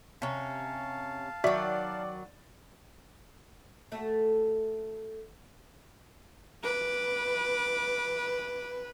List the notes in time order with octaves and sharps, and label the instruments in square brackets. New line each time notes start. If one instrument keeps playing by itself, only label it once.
[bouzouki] C3 C#4 [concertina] F5 A5
[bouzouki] D#3 F#3 [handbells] F#4 E5 [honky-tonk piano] D5
[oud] A3 F#4
[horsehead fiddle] B4 [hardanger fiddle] D6